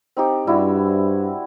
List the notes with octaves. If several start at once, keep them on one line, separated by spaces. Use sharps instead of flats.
C4 D#4 G4
G2 G3 E4 F#4